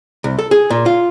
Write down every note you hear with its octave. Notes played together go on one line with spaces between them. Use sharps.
C2
A4
G#4
A#2
F4